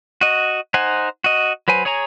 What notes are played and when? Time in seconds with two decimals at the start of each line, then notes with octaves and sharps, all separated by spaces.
0.21 F#4 D#5
0.74 D#4 C5 F#5 G#5
1.24 F#4 D#5
1.68 F#3 B4 C5 G#5
1.85 G#4 C#5 G#5 A#5